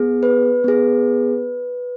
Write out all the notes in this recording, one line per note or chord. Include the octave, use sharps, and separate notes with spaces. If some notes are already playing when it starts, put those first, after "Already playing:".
Already playing: B3 G#4
B4
B3 G#4